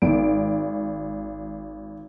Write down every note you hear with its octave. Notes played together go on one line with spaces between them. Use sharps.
G#1 D7